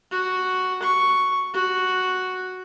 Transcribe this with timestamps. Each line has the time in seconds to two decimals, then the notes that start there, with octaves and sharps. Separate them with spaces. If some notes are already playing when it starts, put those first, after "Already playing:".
0.11 F#4
0.83 C#6
1.54 F#4